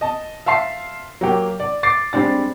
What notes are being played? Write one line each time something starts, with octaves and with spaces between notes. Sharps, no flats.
D#5 A5
E5 F5 A5 C6 C7
F#3 A#3 G4
D5
D6 A6 C7
G3 G#3 C4 D4 A6